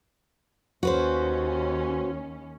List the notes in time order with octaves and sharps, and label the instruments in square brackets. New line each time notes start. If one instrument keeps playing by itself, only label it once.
[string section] D#2 C#4 [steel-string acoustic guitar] F#4 B4 C5